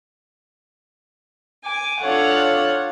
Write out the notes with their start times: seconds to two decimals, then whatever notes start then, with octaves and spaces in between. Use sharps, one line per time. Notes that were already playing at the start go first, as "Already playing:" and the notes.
1.64 G#5 D6
2.01 D4 F4 A4 C#5 F5 F#5